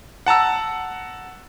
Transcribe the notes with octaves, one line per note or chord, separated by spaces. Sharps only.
F#5 A5 A#5 E6